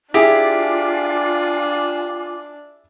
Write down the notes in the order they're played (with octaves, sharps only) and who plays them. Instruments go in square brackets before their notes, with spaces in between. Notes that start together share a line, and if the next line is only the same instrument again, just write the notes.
[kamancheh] D4 [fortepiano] E4 G#4 [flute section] F4 G#5 D6 [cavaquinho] G4